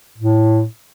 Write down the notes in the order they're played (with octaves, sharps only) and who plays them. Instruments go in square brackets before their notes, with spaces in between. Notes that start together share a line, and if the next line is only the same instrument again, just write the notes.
[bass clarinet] A2